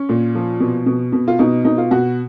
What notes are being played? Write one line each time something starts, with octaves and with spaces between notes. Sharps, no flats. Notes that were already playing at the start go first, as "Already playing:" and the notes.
Already playing: C#4
A#2
F3
B2
B2
B2
F4
B2 D#4
B2 D#4
F4
B2 F#4